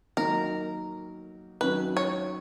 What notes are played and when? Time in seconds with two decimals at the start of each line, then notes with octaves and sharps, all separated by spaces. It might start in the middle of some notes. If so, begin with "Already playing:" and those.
0.17 D#3 F#3 A#3 D#4 A#4
1.61 D#3 F#3 C#4 B4
1.97 C#5